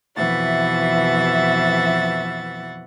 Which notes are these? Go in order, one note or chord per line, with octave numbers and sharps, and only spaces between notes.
F2 B2 E3 E5 F#5 A6